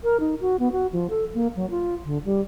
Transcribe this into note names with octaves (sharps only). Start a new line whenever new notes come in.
A#4
D#4
F#4
B3
F#4
F3
A4
A#3
F#3
F4
D3
G3